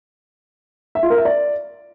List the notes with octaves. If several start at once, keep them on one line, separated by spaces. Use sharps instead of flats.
E5
F4
A#4
E5
D5